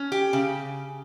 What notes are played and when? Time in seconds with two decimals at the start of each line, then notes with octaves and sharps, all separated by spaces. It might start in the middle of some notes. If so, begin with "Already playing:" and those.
Already playing: C#4
0.12 G4
0.33 C#3